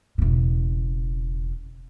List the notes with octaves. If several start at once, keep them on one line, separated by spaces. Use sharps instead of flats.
E1 C#3